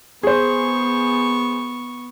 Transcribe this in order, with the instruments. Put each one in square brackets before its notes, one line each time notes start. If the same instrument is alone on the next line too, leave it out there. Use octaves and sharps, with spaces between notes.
[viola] B3 C#6 [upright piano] G#4 C5